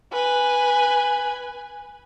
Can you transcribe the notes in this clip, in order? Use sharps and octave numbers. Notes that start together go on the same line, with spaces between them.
B4 G#5